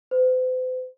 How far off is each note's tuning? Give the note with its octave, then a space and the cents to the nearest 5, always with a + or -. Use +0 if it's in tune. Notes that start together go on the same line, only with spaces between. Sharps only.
C5 -45